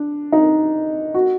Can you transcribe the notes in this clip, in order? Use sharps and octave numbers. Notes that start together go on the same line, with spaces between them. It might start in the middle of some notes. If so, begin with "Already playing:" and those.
Already playing: D4
D#4
F#4